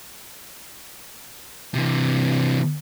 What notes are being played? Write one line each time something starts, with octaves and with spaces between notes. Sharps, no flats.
C3 E3